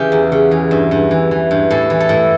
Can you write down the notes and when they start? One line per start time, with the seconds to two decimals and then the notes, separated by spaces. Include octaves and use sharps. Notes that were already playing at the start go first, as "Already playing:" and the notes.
Already playing: C#3 E3 G4
0.12 E2
0.32 C#3
0.51 E3
0.71 G2
0.91 G2
1.11 E3
1.31 E3
1.51 G2
1.70 A2 A4
1.90 E3
2.00 A4
2.09 A2